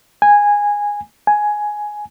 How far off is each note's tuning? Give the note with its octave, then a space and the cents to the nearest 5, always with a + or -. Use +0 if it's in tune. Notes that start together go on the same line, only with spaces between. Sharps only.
G#5 -10
G#5 +10